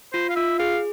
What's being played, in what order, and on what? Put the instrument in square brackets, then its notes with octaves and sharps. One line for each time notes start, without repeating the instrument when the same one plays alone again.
[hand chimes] F4 [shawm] C5
[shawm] F5
[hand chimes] F4 [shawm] E5
[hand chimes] G#4 [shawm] F5